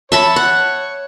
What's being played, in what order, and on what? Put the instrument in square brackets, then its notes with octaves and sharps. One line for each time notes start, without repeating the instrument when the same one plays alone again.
[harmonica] C#5 [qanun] E5 A5 B5
[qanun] F#5